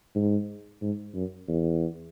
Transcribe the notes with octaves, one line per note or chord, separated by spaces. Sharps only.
G#2
G#2
F#2
E2